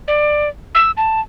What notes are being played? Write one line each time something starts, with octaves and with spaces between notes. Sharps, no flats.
D5
E6
A5